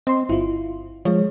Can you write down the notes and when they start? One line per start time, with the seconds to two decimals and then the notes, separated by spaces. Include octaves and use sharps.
0.07 C4 D#5 C6
0.29 G1 E4 F4
1.05 F3 G#3 C#5